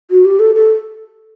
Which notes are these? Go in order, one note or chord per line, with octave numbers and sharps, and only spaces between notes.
F#4
G4
A4
A4